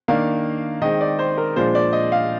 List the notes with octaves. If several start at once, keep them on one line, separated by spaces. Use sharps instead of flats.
D#3 A#3 D4 F5
D#3 G#3 C4 D#5
D5
C5
A#4
A#2 F3 G#3 D4 C5
D5
D#5
F5